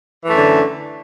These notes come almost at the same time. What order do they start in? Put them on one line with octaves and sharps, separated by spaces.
E3 A3 F#2 D3